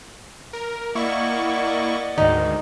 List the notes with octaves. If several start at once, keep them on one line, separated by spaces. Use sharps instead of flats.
A#4
A#3 E4 D5 D#5 F#5 C#6
D2 G#2 D#3 D#4